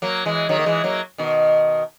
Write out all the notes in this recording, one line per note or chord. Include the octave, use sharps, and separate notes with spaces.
F#3 A#3
E3 G#3
D#3 F#3
A#3
E3 G#3
F#3 A#3
B2 D#3